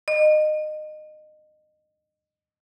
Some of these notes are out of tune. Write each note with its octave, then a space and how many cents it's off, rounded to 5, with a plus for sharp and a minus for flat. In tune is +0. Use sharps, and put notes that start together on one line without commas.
D#5 -25